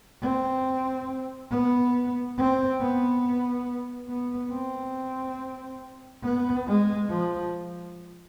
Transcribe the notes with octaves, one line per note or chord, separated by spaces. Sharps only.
C4
B3
C4
B3
B3
C4
B3
G#3
F3